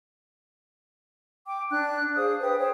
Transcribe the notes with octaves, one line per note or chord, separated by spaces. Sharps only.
G5 D6
D4 F#6
G#4 C5 F5 D#6
B4 G5 D#6
C5 C#5 G5